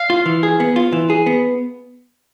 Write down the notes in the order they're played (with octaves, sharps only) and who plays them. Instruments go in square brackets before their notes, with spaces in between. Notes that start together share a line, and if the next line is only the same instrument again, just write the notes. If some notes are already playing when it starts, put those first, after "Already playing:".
Already playing: [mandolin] F5
[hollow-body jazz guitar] F4
E3
G#4
B3
F4
E3
G#4
B3